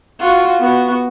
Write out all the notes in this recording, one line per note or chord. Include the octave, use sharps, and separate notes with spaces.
F4 F#4
B3 F#4